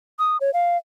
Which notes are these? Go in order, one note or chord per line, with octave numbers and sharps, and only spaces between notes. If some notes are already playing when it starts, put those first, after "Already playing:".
D#6
C#5
F5